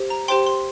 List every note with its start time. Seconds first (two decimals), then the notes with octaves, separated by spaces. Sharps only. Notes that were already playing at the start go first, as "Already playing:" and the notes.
Already playing: G4 C5
0.10 A#5
0.28 G4 C5 G5 C6
0.47 C6